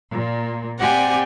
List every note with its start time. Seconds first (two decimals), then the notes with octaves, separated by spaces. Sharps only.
0.12 A#2
0.79 C4 G4 D5 F#5 G#5